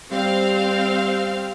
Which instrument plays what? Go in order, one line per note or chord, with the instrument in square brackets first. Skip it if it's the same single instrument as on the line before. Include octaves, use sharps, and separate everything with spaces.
[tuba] G3 [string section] C4 F5